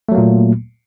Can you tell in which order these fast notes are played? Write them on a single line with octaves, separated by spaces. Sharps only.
A3 F#3 A#3 A#2